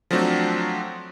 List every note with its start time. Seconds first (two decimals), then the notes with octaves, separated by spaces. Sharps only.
0.11 F3 F#3 A3 C4 D4 F#4